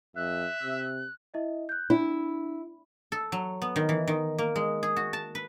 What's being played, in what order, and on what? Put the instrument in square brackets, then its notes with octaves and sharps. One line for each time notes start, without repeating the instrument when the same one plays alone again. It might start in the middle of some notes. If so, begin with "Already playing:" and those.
[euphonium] F2 [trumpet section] E5 [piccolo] F#6
[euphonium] C3
[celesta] E4 D#5 E5
F#6 G6
[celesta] D4 [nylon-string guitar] E4
[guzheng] A4
F#3
B3
D#3
E3
D#3
A#3
G#3
G#4
F#4
A5
B4